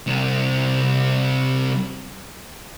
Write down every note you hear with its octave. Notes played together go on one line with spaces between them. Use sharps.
C2 C3